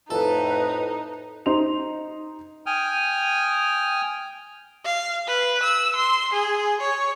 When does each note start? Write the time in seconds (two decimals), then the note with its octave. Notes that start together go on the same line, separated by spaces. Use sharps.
0.10 F2 A2 D#4 A4 B4
1.46 D#4 C5 C6 F7
2.66 G5 G#5 D#6 F6
4.85 F5
5.27 B4
5.63 E6
5.96 C6
6.33 G#4
6.81 C#5